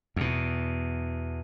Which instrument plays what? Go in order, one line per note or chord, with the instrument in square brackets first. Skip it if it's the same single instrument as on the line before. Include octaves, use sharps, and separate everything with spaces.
[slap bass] E2 B2